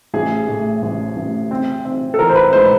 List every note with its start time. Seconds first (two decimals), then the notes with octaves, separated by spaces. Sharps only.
0.14 A1 G#4
0.48 A2
0.82 A1
1.16 A1
1.51 C4
1.85 C4
2.14 A4
2.19 E3 A#4
2.29 C5
2.36 B4
2.53 G#3 C5